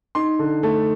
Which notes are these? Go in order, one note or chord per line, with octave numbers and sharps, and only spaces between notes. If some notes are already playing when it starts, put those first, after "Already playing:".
D#4 C6
D3
A3 A5